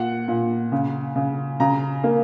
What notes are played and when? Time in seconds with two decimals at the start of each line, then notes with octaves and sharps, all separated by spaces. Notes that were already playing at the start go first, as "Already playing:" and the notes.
Already playing: A#2 F#5
0.28 A#2
0.72 C#3
1.16 C#3
1.60 C#3 A#5
2.04 A#3